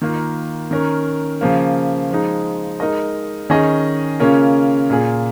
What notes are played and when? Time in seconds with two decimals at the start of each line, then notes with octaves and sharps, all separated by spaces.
0.01 D#3 A#3 F4
0.71 D#3 C#4 A#4
1.41 C#3 F3 A#3
2.11 F3 G#3 D#4
2.80 G#3 D#4 A#4 D#5
3.50 D#3 C#4 G#4 D#5
4.20 C#3 A#3 C#4 F4 A#4
4.90 A#2 A#3 F4 G#4